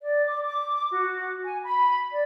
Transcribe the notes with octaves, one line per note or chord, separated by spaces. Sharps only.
D5
D6
D6
F#4
G#5
B5
D5